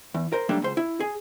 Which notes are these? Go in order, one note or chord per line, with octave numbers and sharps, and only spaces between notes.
E2
A#4 C5
F#3 G3 A3 A#3 D4
C#2 C5
E4
G#4